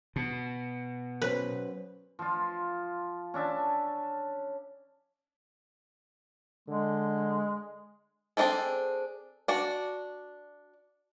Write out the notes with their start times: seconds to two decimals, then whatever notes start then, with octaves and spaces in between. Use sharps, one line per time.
0.16 B2
1.22 F#3 C#4 B4 C5
2.19 F3 F4
3.34 C#4 D4 E5 A5
6.68 D3 G#3
8.37 C4 D4 E4 G#4 A4
9.48 D4 F#4 D5